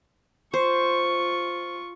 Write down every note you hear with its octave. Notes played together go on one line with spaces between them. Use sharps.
F4 C5 C#6